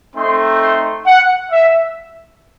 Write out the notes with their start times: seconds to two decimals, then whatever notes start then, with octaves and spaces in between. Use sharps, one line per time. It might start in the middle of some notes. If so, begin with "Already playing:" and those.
0.16 A3 C4 D#4 C6
0.61 C6
1.07 F#5
1.52 E5